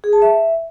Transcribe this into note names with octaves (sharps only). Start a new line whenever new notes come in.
G#4
A5
E5